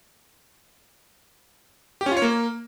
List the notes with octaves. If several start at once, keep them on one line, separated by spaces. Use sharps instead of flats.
G4
C#4
F4
C#5
A#3